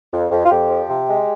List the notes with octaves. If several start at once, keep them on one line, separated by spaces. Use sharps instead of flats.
F2
F2
F4
F2 G4
F3
C3
G#3